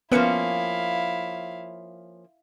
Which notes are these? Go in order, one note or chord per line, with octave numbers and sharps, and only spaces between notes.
F3 A#3 B3 C#4 E4 B4 F5 C#7